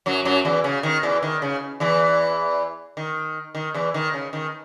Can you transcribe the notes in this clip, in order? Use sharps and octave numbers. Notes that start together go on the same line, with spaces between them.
F#2 F#3
F#2 F#3
E2 E3
C#3
D#3
E2 E3
D#3
C#3
E2 E3
D#3
D#3
E2 E3
D#3
C#3
D#3